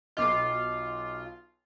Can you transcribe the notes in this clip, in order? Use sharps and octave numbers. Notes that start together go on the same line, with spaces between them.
B1 F4 D#5 D6 C7